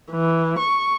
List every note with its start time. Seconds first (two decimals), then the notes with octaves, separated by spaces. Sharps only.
0.12 E3
0.58 C#6